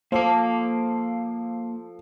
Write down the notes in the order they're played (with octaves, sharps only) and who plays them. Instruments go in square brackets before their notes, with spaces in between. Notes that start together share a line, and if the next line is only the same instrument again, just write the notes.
[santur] F3 A4 D6 [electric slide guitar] A#3 F5 [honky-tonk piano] C5